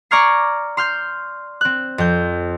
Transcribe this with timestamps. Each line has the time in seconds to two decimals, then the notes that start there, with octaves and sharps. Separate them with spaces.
0.11 D5 A#5 C#6 F6 G#6 C7
0.77 C6 F6 G6
1.61 C4 F#6
1.98 F2 G6